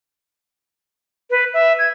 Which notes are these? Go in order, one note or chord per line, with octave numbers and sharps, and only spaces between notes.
B4
E5
G#6